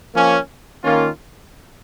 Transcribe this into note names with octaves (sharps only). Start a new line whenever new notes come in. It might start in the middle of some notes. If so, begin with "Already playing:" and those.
F3 A#3 C#4
D#3 A#3 C#4 F4